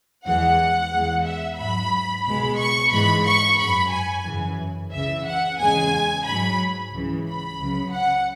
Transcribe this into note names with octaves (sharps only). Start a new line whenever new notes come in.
E2 E3 G#3 F#5
E2 E3 G#3
E5
G#2 F#3 B5
C#2 B2 G#3 B5
C#6
G#2 E3 G#3 B5
C#6
F#2 F#3 B5
G#5
F#2 C#3 E3
C#2 C#3 E3 E5
F#5
E2 C#3 G#3 G#5
G#2 F#3 B5
C#2 C#3 E3
B5
C#2 C#3 F#3
F#5